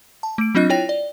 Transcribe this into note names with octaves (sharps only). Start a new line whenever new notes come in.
A5
A3 D7
F#3 C4 D4 F4 D#5 F#6
E4 F4 C#5 G5 A#6 F7
D5